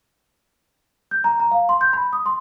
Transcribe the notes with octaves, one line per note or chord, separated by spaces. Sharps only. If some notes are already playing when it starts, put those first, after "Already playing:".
G6
A#5
A#5
F5
C6
G6
B5
D#6
C6